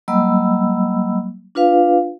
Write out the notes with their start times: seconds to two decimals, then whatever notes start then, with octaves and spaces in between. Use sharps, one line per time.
0.08 F#3 G3 A#3 D#5 B5 E6
1.55 D4 F4 B4 F5